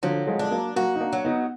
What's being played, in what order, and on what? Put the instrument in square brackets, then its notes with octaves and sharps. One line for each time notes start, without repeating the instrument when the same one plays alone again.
[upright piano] D3 F3 [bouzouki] F#3
[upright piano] F3 G#3
[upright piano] G#3 [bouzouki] D4
[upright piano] F#3 A#3
[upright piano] F#3 A#3 [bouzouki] F#4
[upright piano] D#4
A#3 D4
[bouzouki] F#3
[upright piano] B3 D#4